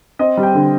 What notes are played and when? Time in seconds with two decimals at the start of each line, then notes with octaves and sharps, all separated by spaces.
0.19 C4 D#5
0.37 G3
0.43 G5
0.55 D3